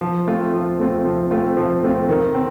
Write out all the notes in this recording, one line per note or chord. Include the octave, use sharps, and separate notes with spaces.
F3
A3 C4 F4
F3
A3 C4 F4
F3
A3 C4 F4
F3
A3 C4 F4
D#3
C4